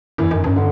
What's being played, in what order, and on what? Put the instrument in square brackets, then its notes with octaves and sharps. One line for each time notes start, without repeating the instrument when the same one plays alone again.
[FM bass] F#2 [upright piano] E3
[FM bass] F#2 [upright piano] D#3
[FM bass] G2 [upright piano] C#3
[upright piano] D3